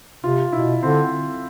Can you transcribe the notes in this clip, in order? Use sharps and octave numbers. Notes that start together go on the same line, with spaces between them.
C3 F4
B2 E4
D3 C4